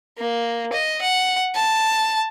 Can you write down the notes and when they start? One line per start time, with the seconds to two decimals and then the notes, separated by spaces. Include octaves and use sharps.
0.18 A#3
0.73 D#5
1.02 F#5
1.55 A5